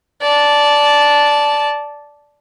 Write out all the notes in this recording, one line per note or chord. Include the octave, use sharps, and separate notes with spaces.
D5 A5